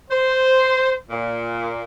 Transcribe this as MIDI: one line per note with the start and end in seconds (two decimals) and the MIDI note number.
0.10 0.91 72
1.09 1.82 46